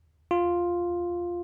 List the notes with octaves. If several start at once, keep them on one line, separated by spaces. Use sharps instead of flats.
F4